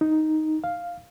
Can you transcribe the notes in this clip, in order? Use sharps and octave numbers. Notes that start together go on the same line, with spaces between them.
D#4
F5